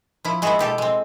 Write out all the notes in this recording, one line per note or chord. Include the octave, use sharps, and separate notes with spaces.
F3 E4
G#3 B3 E4 F#4 G#4
B2 G4 A4
G#3 C4